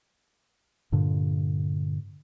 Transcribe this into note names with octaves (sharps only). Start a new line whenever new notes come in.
G2 A#2 D3